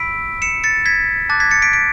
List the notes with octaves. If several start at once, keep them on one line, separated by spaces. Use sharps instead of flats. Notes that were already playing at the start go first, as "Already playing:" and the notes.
Already playing: B5 E6 B6 D7
C#7 E7
A6 C#7
G#6 B6
A5 D6 F#6 A6
G#6 B6
A6 C#7
B6 D7
B6 D7